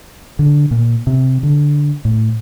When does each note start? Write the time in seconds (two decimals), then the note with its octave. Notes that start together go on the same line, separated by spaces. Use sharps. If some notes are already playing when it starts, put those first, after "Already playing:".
0.39 D3
0.71 A#2
1.07 C3
1.43 D3
2.05 A2